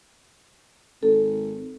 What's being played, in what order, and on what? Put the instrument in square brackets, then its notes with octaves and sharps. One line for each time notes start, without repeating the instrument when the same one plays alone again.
[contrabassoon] G#1 [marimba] A4